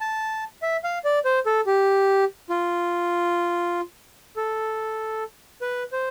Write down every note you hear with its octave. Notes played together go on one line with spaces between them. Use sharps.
A5
E5
F5
D5
C5
A4
G4
F4
A4
B4
C5